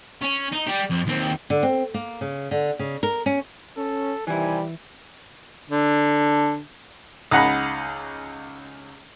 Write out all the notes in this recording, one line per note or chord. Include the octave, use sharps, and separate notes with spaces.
C#4
D#4
G3 G4
F2
D#2 C4
D3
C4
A#3
C#3
D3
C#3
A#4
C#4
C#4 A4
C3 D#3 E3 G3 E4 G#5
D3
C#2 D#4 G#4 F#5 A#5 B5